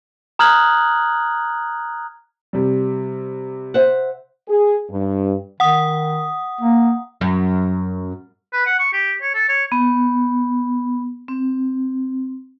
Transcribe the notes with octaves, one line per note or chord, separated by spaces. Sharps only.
A#5 D#6 F6 F#6 G#6 F#7
C3 G3
C5 E5 F#5
G#4
G2
D#3 F#5 D#6
A#3
F#2
B4
F#5
C#6
G4
C#5
A4
C#5
B3
C4